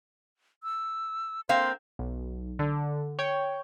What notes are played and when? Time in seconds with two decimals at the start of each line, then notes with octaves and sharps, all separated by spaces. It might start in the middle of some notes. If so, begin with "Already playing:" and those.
0.63 E6
1.49 A#3 C4 F5 C6
1.99 B1
2.59 D3
3.19 C#5 G5